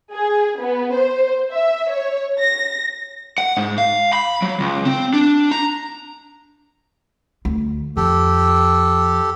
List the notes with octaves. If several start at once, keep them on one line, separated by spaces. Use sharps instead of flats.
G#4
B3
C5
E5
C#5
A#6
F#5
G#2
F5
B5
F#3
C#2
C4
D4
A#5
D2
F2 G4 A4